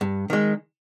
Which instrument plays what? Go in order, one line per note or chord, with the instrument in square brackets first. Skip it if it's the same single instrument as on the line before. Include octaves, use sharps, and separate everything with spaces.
[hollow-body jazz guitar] G2
D#3 G#3